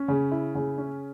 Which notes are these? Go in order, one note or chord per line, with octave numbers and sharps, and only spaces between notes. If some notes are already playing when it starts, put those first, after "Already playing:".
Already playing: C#4
C#3
E4
C#3
C#4